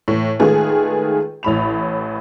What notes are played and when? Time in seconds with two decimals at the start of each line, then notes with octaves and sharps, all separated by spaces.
0.08 A2 E3
0.39 D#3 G#3 A3 F4 G#4 B4
1.43 A1 A2 B5 F7